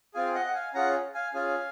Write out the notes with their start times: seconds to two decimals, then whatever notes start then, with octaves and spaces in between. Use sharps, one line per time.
0.14 C4 F4 G#4 F5 G#5
0.35 D#5 F#5
0.45 F#5
0.54 F5 G#5
0.74 C#4 F4 G#4 F#5 A#5
1.14 F5 G#5
1.34 C#4 F4 G#4 F5 G#5